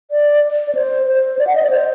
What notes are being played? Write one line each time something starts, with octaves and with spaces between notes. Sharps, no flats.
D5
D5
C5
C5
D5
F#5
D#5
D5
C5